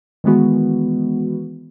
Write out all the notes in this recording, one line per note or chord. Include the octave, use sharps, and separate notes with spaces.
D#3 E3 G#3 B3 F#4